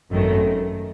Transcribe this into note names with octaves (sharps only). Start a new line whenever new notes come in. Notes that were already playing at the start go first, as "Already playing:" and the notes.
G#1 F#2 D#3 A3